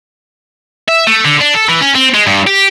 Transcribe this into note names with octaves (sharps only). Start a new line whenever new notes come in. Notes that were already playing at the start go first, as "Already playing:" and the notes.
E5
A3
D3
D4
A4
E3
C#4
C4
G#3
G2
G4